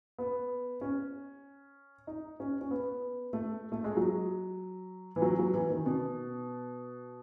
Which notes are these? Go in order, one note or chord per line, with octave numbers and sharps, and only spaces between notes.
B3
C#4
D#4
C#4
C#4
B3
A3
A3
G#3
F#3
E3
F#3
F#3
E3
D#3
B2